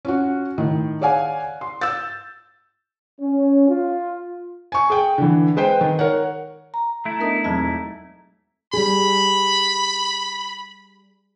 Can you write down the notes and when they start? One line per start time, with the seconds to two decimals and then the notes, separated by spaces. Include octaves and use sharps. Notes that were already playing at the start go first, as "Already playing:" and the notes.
0.05 C#4 F4 F#4
0.58 A2 D#3
1.01 G#4 C#5 D5 F5 F#5 G#5
1.61 C6
1.81 E6 G6 A6
3.20 C#4
3.68 F4
4.72 G#5 C#6
4.90 G#4 G5
5.18 D3 E3
5.56 G#3 B4 C5 G5
5.81 D#3
5.99 A#4 C#5 F#5
6.74 A#5
7.05 A3 E4
7.20 B3 D4 D#4 A#4 D#5 D#6
7.44 E1 F#3 C4 D#4 A5 G#6
8.73 G3 G#4 B5